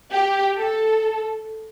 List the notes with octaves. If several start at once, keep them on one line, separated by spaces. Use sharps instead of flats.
G4
A4